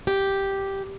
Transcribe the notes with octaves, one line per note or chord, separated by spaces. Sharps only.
G4